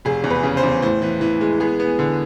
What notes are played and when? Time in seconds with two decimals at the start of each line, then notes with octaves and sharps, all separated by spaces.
0.05 F1 G#4
0.24 E2
0.30 B4
0.43 C#3
0.57 C5
0.63 E2
0.82 A2 C5
1.02 E3
1.21 E3
1.41 G#3
1.60 B3 G#4
1.80 B3
1.99 D3